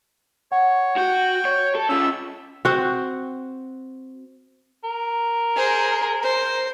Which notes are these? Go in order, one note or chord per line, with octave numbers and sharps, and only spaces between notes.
C#5 F#5
F#4 G5
C#5
A4
C#4 F4 E5 E6
C4 F#4
A#4
G#4 C5
C5